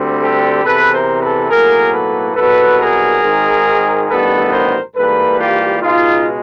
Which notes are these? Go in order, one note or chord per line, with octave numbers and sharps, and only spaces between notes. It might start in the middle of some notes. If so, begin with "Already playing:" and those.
Already playing: D2 D3 G3 C4
G4 A4
E2 C3 E3 A4 B4
A#4 C5
A4 B4
B1 A2 F#3 A#3 G#4 A#4
A4 B4
C2 B2 F#3 A4 B4
G#4 A#4
G#1 G#2 D#3
A1 G2 D#3 G3 B3 A4 B4
A#4 C5
G#2 E3 G3 A#3 A4 B4
F4 G4
C#2 B2 G#3 D#4 F4